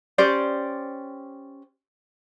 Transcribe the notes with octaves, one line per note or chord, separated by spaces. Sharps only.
C#4 G4 C5 D5